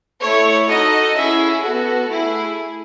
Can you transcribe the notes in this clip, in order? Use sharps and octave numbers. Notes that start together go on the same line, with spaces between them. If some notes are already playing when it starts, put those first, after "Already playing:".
A3 E4 A4 C#5
D#4 F#4 A4 D#5
C#4 E4 G#4 E5
B3 F#4 A4
A3 E4 G#4